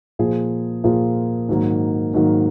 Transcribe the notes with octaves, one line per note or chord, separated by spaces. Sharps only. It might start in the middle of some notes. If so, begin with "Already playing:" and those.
A#2 F3 A#3 F4 G#4
A#2 F3 A#3 F4 G#4
G#2 D#3 F#3 A#3
G#2 D#3 F#3 A#3